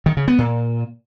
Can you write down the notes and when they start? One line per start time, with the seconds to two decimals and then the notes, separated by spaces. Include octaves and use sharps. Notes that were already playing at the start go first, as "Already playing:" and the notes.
0.06 D#3
0.17 C#3
0.28 B3
0.38 A#2